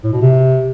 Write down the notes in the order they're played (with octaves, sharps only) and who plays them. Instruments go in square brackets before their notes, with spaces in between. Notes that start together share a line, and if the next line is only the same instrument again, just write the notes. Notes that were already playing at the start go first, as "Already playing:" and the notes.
[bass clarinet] A2
B2
C3